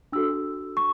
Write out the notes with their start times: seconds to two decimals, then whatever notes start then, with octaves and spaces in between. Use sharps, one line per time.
0.12 D4 F#4 A4 E6
0.77 C#6